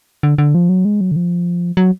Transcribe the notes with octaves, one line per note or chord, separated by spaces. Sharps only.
D3
D3
F3
F#3
G#3
F#3
D3
F3
F#3